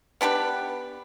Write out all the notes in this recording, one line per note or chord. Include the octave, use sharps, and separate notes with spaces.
B3 D4 G4 B4